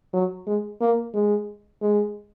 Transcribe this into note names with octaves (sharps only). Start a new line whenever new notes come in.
F#3
G#3
A#3
G#3
G#3